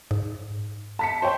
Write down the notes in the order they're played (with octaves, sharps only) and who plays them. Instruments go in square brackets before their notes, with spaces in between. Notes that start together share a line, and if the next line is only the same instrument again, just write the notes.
[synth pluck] G#2
[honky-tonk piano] A5 B6 C#7
C5 C#5 G5